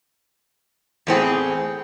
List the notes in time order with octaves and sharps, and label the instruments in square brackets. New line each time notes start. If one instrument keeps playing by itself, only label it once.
[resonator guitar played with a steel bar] E2 A2 C4 G#4